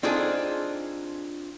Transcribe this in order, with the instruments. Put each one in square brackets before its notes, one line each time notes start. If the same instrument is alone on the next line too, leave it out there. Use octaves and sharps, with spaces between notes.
[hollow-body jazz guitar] C4 D4 D#4 F4 G#4 A4